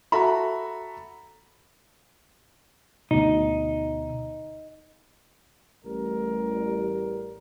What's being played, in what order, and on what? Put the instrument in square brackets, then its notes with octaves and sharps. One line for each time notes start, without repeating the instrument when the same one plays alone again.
[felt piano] F#4 A4 E5 A#5 B5
[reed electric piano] D2 B2 [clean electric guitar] D#4
[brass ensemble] A1 G3 A#4